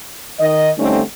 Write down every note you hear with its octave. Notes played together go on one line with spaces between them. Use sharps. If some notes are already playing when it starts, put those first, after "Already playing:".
D#3 D#5
D3 G3 A3 C4 C#4 D#4